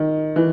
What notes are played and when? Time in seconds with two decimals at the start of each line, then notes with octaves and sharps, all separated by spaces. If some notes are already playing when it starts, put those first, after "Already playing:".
Already playing: D#3
0.36 E3